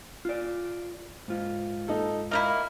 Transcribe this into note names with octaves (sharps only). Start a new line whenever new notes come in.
F4 D5
G#2 F4
D#4 A4
A#3 D#4 E4 D#5 F5 F6